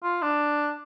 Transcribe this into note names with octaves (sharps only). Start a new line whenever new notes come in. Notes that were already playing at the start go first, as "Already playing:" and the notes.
F4
D4